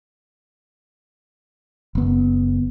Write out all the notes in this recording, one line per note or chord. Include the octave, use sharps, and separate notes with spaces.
F#1 B3